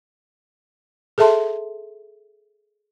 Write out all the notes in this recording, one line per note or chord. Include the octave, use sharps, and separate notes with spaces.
G#4 A4 E5 A5 C6